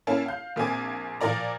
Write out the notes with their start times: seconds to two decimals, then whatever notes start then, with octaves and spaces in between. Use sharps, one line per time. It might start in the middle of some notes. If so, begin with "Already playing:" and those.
0.07 A#3 C#4 E4 A5
0.26 F5 G6
0.56 A#1 A#3 C4 G#5 D6
1.21 A#2 F3 A#4 D5 A#5